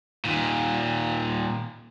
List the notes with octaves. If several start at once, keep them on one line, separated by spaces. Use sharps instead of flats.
D#2 A#2